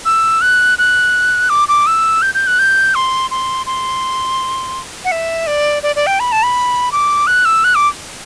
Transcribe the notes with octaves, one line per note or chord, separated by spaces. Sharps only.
E6
F#6
F#6
D6
D6
E6
G6
G6
F#6
G6
C6
C6
C6
F#5
E5
D5
D5
D5
G5
B5
A5
B5
D6
F#6
E6
F#6
D6